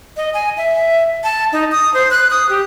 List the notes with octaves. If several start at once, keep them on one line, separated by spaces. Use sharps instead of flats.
D#5
G#5
E5
A5
D#4
D#6
C5
F#6
D#6
G4